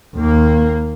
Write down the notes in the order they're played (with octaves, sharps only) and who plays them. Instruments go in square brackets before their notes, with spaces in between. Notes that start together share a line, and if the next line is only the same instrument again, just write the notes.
[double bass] D#2 A#3